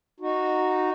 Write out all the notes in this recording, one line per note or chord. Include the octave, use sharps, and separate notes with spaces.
D#4 F#4